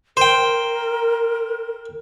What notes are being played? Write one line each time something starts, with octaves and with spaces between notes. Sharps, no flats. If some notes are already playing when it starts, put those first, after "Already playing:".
A#4 C5 G5